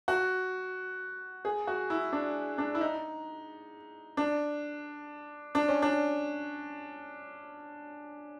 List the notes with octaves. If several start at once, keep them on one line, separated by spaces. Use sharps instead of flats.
F#4
G#4
F#4
E4
D4
D4
E4
D#4
D4
D4
C#4
D4